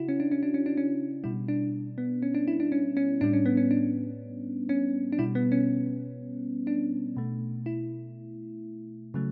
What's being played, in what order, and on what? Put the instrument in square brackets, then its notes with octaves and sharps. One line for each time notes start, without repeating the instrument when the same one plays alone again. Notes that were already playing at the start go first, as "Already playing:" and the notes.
Already playing: [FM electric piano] C#3 E4 F#4
C#4
D4
C#4
D4
C#4
D4
C#4
B2 G3 E4
D4
B3
C#4
D4
E4
D4
C#4
C#4
A2 G3 D4
C#4
B3
C#4
D4
C#4
D4
B2 G3 E4
B3
C#4
D4
B2 A3
E4
C#3 F#3 A3